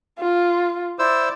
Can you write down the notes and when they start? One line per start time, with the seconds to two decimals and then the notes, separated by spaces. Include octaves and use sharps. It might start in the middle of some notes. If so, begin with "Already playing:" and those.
0.20 F4
0.99 E4 C5 D5 E6